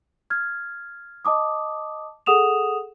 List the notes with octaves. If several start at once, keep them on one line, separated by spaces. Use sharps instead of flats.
F6 G#6
D#5 A5 D6 D#6
G#4 A4 F#5 D#6 E7 F7